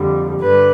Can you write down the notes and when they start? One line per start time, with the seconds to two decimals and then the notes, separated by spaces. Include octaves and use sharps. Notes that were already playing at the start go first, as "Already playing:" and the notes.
Already playing: F2 D3 G3
0.39 G2 D3 G3 B4